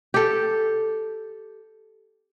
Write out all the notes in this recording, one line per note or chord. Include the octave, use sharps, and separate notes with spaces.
G4 A4